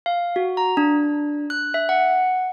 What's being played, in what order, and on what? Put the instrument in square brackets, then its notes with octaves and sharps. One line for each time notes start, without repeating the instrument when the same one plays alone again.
[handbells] F5
F#4
A#5
D4
F#6
E5
F#5